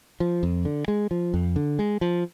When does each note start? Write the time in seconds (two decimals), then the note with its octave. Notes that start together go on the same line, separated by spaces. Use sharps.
0.20 F3
0.43 F2
0.65 D3
0.88 G#3
1.11 F3
1.34 F2
1.56 D3
1.79 G#3
2.01 F3